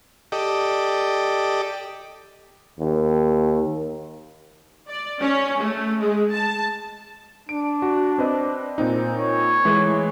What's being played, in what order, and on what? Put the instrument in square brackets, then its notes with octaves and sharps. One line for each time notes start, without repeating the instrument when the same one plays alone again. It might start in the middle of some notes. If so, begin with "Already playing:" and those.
[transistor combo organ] G4 A4 D5 D#5
[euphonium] D#2
[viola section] D5
C#4
A3
G#3
A5
[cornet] D4 [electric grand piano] D7
[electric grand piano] F#4
C4 B4 D#5
A#2 C4 D#4
[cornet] C#5
[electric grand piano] E3 G#3 A3